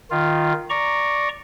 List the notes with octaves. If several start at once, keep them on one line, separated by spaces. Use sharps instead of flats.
D#3 F4
D5 A#5 C#6